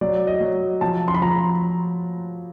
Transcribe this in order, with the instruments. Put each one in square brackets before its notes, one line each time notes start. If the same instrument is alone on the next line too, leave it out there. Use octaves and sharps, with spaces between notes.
[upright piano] F#3 [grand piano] D5
[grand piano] D#5
[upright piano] F#3
[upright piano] F3 [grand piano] A5
[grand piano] C6
B5
[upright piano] F3 [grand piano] A#5